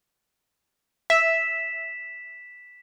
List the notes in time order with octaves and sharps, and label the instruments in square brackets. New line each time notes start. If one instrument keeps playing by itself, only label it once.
[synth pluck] E5 [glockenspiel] B6 E7